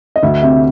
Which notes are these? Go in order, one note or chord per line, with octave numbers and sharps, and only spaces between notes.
D#5
D2 E5
C3 E5